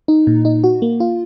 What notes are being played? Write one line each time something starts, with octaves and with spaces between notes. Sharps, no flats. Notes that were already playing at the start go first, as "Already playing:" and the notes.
D#4
A#2
D#4
F#4
A#3
F4